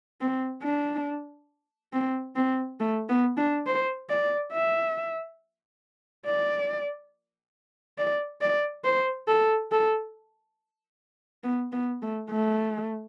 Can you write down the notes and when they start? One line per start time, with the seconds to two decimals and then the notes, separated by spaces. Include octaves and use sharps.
0.21 C4
0.63 D4
1.93 C4
2.36 C4
2.80 A3
3.09 B3
3.37 D4
3.67 C5
4.10 D5
4.52 E5
6.26 D5
7.98 D5
8.41 D5
8.84 C5
9.28 A4
9.72 A4
11.44 B3
11.73 B3
12.02 A3
12.30 A3